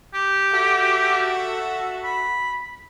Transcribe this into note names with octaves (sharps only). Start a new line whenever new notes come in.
G4
F#4 A4 E5
B5